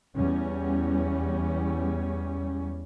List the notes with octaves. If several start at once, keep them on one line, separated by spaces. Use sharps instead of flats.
E2 G3 C#4